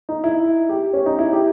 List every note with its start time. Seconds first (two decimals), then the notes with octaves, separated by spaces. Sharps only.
0.09 D#4
0.24 E4
0.69 G4
0.93 C#4
1.06 D#4
1.19 E4
1.33 G4